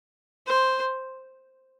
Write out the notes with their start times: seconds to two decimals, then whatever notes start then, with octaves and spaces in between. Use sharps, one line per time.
0.47 C5